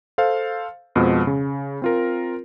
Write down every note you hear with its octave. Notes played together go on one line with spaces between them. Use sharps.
A4 C5 F5
F2 B2 F3 G#3
C#3
C4 F4 A#4